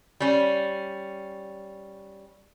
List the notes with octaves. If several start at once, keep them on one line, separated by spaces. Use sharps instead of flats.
G3 C#4